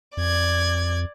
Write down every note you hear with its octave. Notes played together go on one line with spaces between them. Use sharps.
F2 D5 G#6